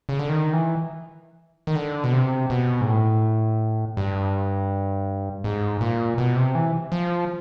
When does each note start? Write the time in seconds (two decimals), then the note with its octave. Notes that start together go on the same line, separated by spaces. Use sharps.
0.09 C#3
0.19 D3
0.29 D#3
0.53 E3
1.67 D#3
1.75 D3
2.04 B2
2.13 C3
2.50 B2
2.81 G#2
2.86 A2
3.97 G2
5.44 G#2
5.81 A#2
6.18 B2
6.36 C3
6.55 E3
6.92 F3